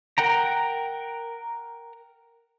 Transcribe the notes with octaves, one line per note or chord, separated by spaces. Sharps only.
A#4 F#5 G5 A#5